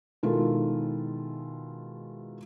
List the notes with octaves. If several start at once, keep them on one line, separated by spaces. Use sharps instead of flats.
B2 D#3 G#3 E4 F4 A4